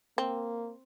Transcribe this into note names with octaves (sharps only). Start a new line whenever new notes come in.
A#3 C4